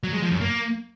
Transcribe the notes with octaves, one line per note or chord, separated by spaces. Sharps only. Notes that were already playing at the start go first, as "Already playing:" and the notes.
F#3
G#3
F3
F#2
A#3